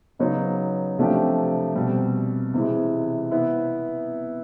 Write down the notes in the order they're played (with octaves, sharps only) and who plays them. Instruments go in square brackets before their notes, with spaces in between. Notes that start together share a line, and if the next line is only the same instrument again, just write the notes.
[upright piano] C#3 F#3 B3 D#4
C3 F3 A3 D4 G4
B2 G3 C4
C3 E3 G#3
B3 E4